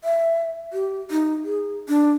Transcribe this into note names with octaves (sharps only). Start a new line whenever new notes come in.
E5
G4
D#4
G#4
D4